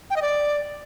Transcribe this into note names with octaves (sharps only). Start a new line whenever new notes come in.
G5
D#5
D5